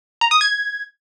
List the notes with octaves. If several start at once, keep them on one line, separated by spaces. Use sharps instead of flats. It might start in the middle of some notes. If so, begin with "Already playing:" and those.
A#5
D#6
G#6